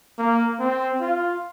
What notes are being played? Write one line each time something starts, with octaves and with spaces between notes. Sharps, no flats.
A#3
C4
F4